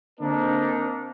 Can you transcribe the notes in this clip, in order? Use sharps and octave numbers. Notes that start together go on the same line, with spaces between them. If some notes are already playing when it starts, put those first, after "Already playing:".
D3 A#3 C4 D4 D#4 A#4